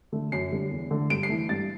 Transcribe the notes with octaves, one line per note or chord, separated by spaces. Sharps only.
D3 A3
F#2 C7
D3 G3
E2
D3 A3
G2 D7
C7
E3 A3
G2 A6